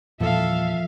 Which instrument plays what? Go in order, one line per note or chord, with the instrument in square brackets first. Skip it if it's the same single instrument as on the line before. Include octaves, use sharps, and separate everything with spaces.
[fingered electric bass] E2 A#2 [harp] F3 [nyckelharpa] A4 [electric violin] E5 F5